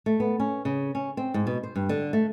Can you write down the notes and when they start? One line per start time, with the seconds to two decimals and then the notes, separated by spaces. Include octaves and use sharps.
0.06 A3
0.20 B3
0.40 C#4
0.65 C#3
0.95 C#4
1.17 C4
1.34 G#2
1.47 B2
1.63 C5
1.76 G2
1.89 D3
2.13 A3